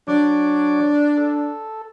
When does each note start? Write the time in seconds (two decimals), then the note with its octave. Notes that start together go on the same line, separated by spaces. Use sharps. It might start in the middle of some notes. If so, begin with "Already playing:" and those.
0.08 F#3 D4 C#5 D6
1.17 A4